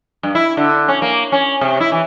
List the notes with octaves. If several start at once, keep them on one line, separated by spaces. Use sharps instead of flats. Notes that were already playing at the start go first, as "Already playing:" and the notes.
G2
E4
D3
C#4
A#3
C#4
C3
E4
E3